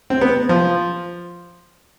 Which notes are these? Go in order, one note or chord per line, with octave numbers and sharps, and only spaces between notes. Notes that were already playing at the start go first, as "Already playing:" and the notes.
C4
B3
F3